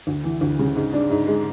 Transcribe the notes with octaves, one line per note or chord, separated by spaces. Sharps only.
D2
E3
D2
C#3
G#2
D4
G#2
G#3